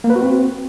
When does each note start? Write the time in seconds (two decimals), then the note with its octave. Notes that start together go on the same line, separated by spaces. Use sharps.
0.04 A#3
0.10 B4
0.16 F#4
0.21 C4